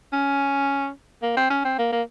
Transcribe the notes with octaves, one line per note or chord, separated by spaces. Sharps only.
C#4
A#3
C4
C#4
C4
A#3
A#3